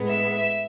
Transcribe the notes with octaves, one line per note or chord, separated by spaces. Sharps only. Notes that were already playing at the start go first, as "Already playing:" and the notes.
Already playing: A2 G#3 B3
E5